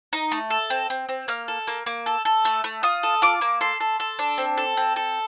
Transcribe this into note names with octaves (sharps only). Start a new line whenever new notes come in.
D#4
A3
A4
C4
C4
C4
A#3 F6
A4
A#3
A#3
A4
A4
A3
A3
F4 D#6
A4
F4 D6
A#3
A4 C6
A4
A4
D4
C4
A4
C4
A4